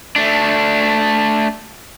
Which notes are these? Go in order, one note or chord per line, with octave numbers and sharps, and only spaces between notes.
A3 D4